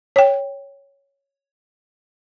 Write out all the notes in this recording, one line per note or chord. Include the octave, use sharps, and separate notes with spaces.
C#5 G5